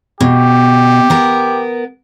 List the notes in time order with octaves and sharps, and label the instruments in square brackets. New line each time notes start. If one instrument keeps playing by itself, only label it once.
[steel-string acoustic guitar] B2 [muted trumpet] G4
[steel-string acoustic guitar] B3 A#4